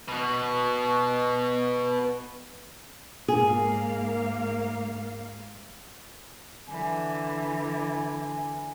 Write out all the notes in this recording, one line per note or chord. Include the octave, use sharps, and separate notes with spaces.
B2 F#4
G#2 A#3 G#4 F5
D3 E3 G#5